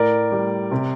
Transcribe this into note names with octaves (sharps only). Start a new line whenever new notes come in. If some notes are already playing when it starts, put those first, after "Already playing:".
Already playing: A2 A#4 D5
G3
C3